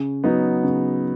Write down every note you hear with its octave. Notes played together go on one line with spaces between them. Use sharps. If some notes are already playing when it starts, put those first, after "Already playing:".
Already playing: C#3
F#3 B3 D#4
C#3